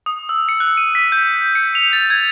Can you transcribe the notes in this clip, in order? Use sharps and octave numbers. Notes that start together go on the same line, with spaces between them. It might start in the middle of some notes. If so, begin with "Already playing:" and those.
D#6
E6
C#7
F#6
D#7
B6
G6
C#7
F7
A6
G#6